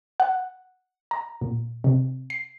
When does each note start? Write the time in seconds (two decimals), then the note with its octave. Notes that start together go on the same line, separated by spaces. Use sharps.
0.20 F#5
1.11 A#5
1.41 A#2
1.84 C3
2.30 C7